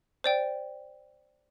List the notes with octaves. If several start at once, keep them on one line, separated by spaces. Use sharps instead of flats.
C5 D5 G5